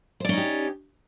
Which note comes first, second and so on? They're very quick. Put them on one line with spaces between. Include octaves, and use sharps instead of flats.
C5 D5 C#4 D#4 G4